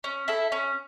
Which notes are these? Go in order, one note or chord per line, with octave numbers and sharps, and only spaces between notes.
C#4
E4 A4 E5
C#4